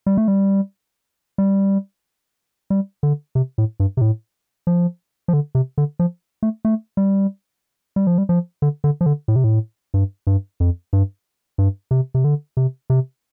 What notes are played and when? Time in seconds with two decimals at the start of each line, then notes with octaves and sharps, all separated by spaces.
0.06 G3
0.17 A3
0.28 G3
1.38 G3
2.70 G3
3.03 D3
3.35 C3
3.58 A2
3.80 G2
3.97 C3
4.01 A2
4.67 F3
5.28 F3
5.33 D3
5.55 C3
5.78 D3
5.99 F3
6.43 A3
6.65 A3
6.97 G3
7.96 G3
8.07 F3
8.18 G3
8.29 F3
8.62 D3
8.84 D3
9.01 F3
9.06 D3
9.28 A2
9.36 C3
9.44 A2
9.94 G2
10.27 G2
10.60 F2
10.93 G2
11.58 G2
11.91 C3
12.14 C3
12.24 D3
12.57 C3
12.90 C3